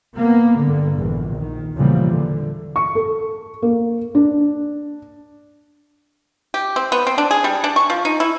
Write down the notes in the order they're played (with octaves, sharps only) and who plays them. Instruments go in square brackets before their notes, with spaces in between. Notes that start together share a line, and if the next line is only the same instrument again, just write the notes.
[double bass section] A#3 B3
G2 D3
A#1 E2
D#3
E2 A#2 C#3 E3 F3 G3
D3
[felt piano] C#6
A4
A#3
D4
[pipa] G4
C4
B3
C4
D4
G#4
G3
D4
C#6
F3
D#4
E4